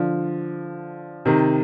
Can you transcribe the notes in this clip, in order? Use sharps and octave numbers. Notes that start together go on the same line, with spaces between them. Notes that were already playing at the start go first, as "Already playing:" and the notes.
Already playing: D3 F3
C3 D#3